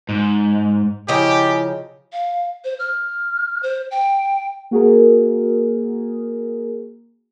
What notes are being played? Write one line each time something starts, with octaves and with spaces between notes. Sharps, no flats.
G#2
C#3 F3 E4 G4 D#5 G#5 A#5
F5
C5
F6
C5
G5
A#3 F#4 G#4 A#4